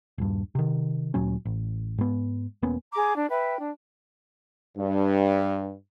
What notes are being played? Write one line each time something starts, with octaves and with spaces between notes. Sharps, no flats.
D#1 G2
C3 D#3
D2 A#2 F#3 C#4
A1
G#2 B3
E1 A#3 B3 C#4
G#4 A#5 D6
D4
B4 E5 G5
D4
G2